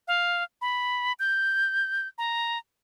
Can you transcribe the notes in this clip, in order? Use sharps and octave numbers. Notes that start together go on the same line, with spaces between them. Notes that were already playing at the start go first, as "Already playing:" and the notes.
F5
B5
G6
A#5